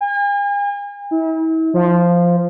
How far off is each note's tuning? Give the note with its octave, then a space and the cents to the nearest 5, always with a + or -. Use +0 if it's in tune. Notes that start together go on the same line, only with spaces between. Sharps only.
G#5 -45
E4 -40
F3 -5